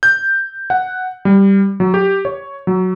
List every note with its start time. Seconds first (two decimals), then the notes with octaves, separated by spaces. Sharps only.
0.03 G6
0.70 F#5
1.25 G3
1.80 F#3
1.94 G4
2.25 C#5
2.67 F#3